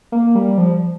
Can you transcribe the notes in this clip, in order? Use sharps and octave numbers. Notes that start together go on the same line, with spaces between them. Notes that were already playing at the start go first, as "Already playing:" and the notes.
A#3
G3
F3